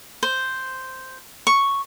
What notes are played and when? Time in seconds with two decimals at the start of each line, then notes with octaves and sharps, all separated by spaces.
0.23 C5
1.47 C#6